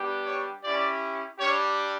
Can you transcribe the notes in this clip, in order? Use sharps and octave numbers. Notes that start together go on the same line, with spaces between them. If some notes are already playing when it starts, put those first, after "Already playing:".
Already playing: G3 B3 D4 G4
C#5
C#4 E4 G4 D5
G3 D4 G4 C#5